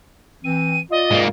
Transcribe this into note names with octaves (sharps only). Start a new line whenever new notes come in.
E3 C4 D#7
F4 D5 D#5
G#2 A#3